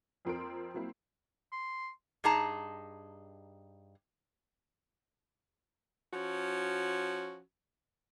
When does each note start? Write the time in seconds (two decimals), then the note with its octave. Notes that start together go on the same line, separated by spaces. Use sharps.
0.25 F2 F3 C4 A#4 C6 D7
0.74 F#3 A#3 C4 E4
1.52 C6
2.24 G2 D#4 G#4 A5 A#5
6.13 F3 C#4 F#4